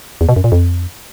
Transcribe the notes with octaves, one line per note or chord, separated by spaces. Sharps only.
E2
B2
F#2
A#2
F2